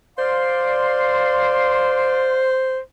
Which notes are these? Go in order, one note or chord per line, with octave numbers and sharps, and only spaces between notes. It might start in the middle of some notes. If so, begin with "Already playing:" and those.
C5 D5 F5 C6